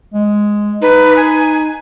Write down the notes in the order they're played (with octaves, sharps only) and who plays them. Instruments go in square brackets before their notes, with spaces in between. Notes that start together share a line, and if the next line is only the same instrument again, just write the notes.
[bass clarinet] G#3
[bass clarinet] D#4 [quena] B4
[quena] G#5